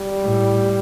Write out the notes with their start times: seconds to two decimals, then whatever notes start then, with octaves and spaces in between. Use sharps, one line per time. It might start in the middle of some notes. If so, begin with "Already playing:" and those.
Already playing: G3
0.22 A2